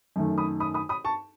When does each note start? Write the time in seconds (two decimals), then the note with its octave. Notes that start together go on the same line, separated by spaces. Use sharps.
0.16 F#2 D#3 A3
0.38 B5 D#6
0.60 B5 D#6
0.74 B5 D#6
0.89 B5 D#6
1.05 A5 C#6